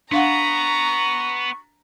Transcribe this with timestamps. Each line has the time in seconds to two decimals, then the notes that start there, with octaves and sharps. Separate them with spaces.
0.12 B3 D4 F5 F#5 A#5 C#6